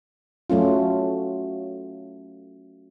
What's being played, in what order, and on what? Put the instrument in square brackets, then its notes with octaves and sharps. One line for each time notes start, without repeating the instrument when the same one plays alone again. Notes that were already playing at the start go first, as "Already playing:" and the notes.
[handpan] F#3 A3 C#4 F4